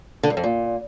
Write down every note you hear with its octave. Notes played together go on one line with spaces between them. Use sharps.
D3
G2
F2
A#2